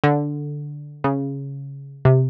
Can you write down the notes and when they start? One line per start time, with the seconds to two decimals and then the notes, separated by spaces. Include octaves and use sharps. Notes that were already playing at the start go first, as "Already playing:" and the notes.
0.04 D3
1.04 C#3
2.05 C3